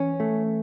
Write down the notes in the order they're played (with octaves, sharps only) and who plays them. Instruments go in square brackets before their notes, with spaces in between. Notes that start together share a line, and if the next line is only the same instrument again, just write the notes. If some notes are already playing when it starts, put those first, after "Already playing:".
Already playing: [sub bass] E3 [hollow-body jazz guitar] C#4
[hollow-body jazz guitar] A3